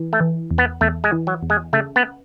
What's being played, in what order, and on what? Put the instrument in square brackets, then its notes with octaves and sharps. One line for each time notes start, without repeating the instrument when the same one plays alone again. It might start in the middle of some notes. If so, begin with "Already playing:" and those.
Already playing: [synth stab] E3
[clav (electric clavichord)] A3
[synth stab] E3
E2
[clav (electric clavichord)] B3
[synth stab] E2 [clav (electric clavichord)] A3
[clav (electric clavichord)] G#3
[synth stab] E3
[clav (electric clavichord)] F#3
[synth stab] E2
[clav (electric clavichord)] G#3
[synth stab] C#3 [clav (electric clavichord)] A3
[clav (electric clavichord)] B3